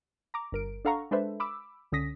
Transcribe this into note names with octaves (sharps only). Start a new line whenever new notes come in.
A#5 D6
G1 A#4 D7
D4 A4 F5 F#5 A#5 C#6
G#3 D4 A4 B4 C5 E5
B5 D6 E6
C#2 D3 C#4 D#6 A#6 B6